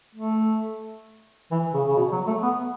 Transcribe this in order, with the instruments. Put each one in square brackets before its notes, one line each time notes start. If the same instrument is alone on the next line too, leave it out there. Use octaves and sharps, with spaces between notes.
[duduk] A3
E3
C#3
C#3
B2
F#3
A3
B3